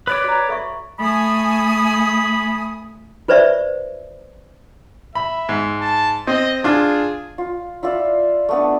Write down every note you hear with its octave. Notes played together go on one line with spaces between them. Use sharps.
B4 C#5 D5 D6
F#4 A#5
A4 E5 C#6
A3 G#5 B5 D#6
F4 B4 C5 D5 E5
E5 B5
G#2
A5
C4 D#5
D4 F4 G#4
F4
E4 F4 D5 E5
A3 B3 D4